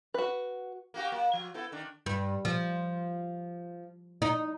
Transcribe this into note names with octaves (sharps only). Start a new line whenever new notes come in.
F#4 B4
A#3 F#4 G4
A#3
F3
B3 E4 A4
D#3 D4
G2
F3
D#4